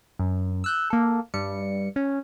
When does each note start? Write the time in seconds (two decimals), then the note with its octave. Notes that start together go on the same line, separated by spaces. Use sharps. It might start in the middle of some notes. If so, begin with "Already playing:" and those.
0.19 F#2
0.64 E6 F#6 G6
0.90 A#3 A4
1.34 G2 G3 C#7
1.96 C#4